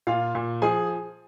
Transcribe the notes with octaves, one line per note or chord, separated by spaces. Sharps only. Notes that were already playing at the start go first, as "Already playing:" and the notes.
A#2 F4 F5
A#2
F3 G#4 G#5